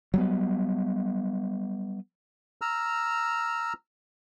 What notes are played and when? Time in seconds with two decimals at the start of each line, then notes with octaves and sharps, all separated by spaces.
0.14 F#3 G3 B3
2.61 A#5 E6 F6